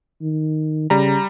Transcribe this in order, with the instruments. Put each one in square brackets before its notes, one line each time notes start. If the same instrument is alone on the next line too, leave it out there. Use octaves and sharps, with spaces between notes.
[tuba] D#3
[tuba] C#3 [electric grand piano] G3 A#5